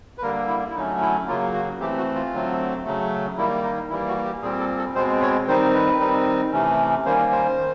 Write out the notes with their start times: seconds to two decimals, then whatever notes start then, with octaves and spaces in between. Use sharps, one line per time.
0.18 B4
0.22 D3 G3 A#3 A#4
0.48 E4
0.70 E4
0.75 D3 F#3 A3 C#4 D#4
1.01 E4
1.27 C#3 F#3 A#3 F4
1.53 F#4
1.80 E3 A3 C4 G4
1.97 F#4
2.15 F4
2.33 D3 F#3 A3 C4
2.84 C#3 F#3 A3
3.38 D#3 G3 A#3 E4
3.64 D#4
3.90 E3 G3 A#3 E4
4.08 F#4
4.25 G4
4.42 A#2 G3 C4 G#4
4.60 A4
4.78 A4
4.95 B2 G#3 C4 C5
5.22 C#5
5.47 D#3 G3 C4 D#4 C5
5.74 B4
6.00 D#3 G3 C4 D#4
6.53 C3 E3 A3 C#4
7.05 D#3 G3 A#3 C#4 C5
7.32 C5
7.58 D#3